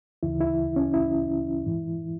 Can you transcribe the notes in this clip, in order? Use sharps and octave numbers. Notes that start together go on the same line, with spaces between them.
D2 C#3 E3 E4
E4
C#4
E4
G#2 E3